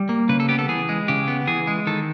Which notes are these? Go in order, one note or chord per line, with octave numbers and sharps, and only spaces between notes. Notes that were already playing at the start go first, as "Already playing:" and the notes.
Already playing: G3
A#3
C#3 B4
A4
B3 G4
A4
E3 G#4
G#3
C#3 G4
B3
E3 G#4
G#3
D#3 A4